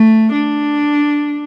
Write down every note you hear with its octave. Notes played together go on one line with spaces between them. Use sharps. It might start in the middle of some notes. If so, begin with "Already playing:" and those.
Already playing: A3
D4